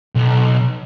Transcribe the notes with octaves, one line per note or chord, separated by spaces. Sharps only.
B1